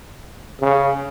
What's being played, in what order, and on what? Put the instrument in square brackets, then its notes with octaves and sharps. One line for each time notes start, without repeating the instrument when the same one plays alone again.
[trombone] C#3